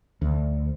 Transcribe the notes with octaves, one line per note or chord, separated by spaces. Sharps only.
D2